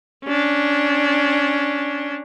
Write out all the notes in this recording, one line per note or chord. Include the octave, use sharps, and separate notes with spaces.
C#4 D4